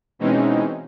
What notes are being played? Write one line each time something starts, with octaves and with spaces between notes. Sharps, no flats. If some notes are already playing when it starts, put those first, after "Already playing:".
B2 E3 G#3 C4 C#4 D#4